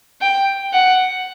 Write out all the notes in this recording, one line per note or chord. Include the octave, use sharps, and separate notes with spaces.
G5
F#5